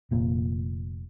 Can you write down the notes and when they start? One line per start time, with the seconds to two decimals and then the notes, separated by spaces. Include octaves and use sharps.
0.11 F1 A#2